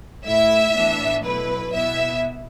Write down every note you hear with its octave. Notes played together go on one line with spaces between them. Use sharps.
A2 A3 E4 E5
A2 E3 B3 D4
B2 F#3 A3 E4 B4
B2 B3 E4 E5